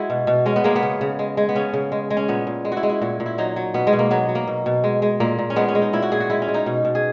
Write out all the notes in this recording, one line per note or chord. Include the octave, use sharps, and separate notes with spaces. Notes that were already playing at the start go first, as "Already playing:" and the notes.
Already playing: G#3 E4 F#4 G#4
B2
B2
G#3 C#4
B3
G#3 A#3
B3
C#3
C#3
G#3
G#3
B3
C#3 C#4
C#3
G#3
G#3
C#4
A#2 B3
A#2
G#3
F#4
E4
G#3
E4
A#2 F#4
A#2
E4
F#3 D#4
F#3
B2 B3
G#3
B2
A#3
F#3 B3
F#3
A#3
B2
B2
G#3
G#3
A#2 A#3
A#2
C#4
G#3 B3
C#4
G#3
D#4
A#2 E4
F#4
A#2 G#4
F#4
G#3 E4
C#4
G#3
D#4
B2
B2
G#4